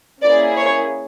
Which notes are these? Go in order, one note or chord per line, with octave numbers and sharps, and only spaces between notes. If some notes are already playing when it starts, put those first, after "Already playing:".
A#3 C#4 E4 G#4 D5
C#5